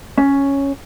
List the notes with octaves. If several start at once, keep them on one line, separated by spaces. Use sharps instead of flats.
C#4